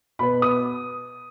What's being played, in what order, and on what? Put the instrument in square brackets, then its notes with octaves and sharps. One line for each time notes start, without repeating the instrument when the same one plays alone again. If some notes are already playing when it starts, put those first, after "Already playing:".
[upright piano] B2 B3 B5
D#6